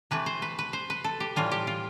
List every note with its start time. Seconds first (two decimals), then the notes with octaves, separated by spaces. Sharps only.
0.11 C3 E3 A3 B4
0.26 C5
0.42 B4
0.59 B4
0.73 C5
0.90 B4
1.04 A4
1.20 G4
1.36 A2 E3 G3 F4
1.51 G4
1.67 F4